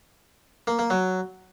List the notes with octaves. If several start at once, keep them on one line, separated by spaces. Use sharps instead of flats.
A#3
A#3
F#3